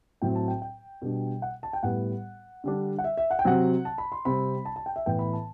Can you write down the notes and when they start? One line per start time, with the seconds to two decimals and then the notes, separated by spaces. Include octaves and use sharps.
0.22 A2 F#3 C4 G5
0.35 A5
0.48 G5
0.62 G5
1.02 B2 G3 B3 D4
1.42 F#5
1.63 A5
1.73 G5
1.83 A2 G3 B3 F#5
2.64 D3 G3 D4
2.98 F#5
3.04 E5
3.17 E5
3.31 F#5
3.39 G5
3.45 C3 F#3 C4 F#5
3.85 A5
3.98 B5
4.12 C6
4.25 C3 G3 C4 B5
4.65 A5
4.76 A5
4.86 G5
4.96 E5
5.06 A2 E3 B3 G5
5.19 B5
5.33 A5